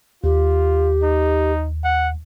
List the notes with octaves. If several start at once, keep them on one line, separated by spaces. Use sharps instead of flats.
D#2 F4 G4
D#4
F#5